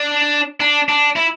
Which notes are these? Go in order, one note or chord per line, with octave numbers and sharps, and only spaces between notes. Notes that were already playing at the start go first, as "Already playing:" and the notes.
Already playing: D4
D4
D4
E4